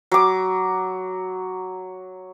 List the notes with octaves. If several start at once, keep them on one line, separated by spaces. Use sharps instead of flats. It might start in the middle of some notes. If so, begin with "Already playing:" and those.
F#3 D6